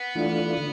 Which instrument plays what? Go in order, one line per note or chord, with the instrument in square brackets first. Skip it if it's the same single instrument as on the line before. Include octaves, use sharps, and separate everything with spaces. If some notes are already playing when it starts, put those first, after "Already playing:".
Already playing: [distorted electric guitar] B3
[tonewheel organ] E3 A3 D4 F4
D3